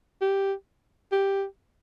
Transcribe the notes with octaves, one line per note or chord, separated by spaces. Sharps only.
G4
G4